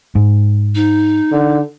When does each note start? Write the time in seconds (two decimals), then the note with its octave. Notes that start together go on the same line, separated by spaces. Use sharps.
0.15 G#2
0.75 D#4
1.32 D3